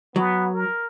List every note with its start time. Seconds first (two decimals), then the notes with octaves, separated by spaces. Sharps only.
0.16 F#3 B3
0.54 A#4